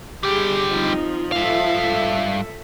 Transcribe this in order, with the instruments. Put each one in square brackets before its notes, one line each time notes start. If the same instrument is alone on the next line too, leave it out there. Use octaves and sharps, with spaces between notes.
[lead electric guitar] D3 G3 [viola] G4 G#4
[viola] F3 [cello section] C4 D#4
[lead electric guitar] G2 F5 [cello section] A4 E5